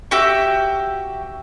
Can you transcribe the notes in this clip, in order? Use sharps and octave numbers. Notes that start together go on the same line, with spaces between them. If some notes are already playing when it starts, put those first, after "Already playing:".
F#4 G4 E5